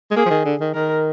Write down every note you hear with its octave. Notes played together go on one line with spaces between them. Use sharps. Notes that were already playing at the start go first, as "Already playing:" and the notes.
G#3
A#3 G#4
F3
D#3
D3
D#3
D#3 A#4